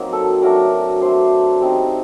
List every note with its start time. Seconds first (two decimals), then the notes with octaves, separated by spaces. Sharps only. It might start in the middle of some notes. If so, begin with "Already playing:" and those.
Already playing: F#3 A#3 C4 D#4
0.13 A4
0.42 F#3 A3 D4 A#4
1.01 A3 D4 C5
1.61 G3 C4 D#4